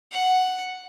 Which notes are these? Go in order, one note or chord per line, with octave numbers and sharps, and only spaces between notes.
F#5